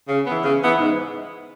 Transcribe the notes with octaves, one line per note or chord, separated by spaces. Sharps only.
C#3
E3 B3
C#3
E3 B3
G#2